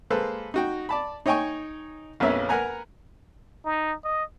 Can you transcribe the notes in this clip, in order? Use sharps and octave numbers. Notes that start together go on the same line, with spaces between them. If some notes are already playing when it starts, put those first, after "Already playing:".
G#3 A#3 A4 B4 C5
D#4 F#4 G5
D5 A5 B5
D#4 C#5 D#5 G5 G#5 C#6
A#1 F2 A#3 B3 C#4 E5
A#4 B4 F#5 G#5 A#5
D#4
D#5